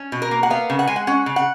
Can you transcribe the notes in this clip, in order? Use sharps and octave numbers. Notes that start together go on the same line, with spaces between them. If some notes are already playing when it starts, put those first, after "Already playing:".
Already playing: C#4
B2
A#4
A#3
F#5
B3 F5
C#3
F#5
G#3 G#5
F#5
C#4 F#5
C#3
F#5